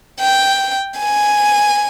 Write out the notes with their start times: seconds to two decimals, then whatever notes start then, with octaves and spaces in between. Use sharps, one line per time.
0.20 G5
0.98 G#5